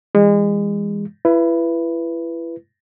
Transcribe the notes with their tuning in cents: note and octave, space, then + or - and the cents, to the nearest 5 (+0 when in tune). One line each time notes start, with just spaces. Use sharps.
E3 +0 G#3 -30
E4 +30 B4 +0